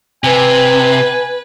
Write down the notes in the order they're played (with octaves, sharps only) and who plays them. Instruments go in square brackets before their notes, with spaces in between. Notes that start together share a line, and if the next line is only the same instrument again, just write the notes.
[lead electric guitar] C3 [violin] B4 [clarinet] G#5